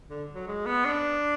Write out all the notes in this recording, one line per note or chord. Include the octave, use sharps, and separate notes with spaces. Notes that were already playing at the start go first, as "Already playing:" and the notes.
D3
F#3
G#3
B3
D4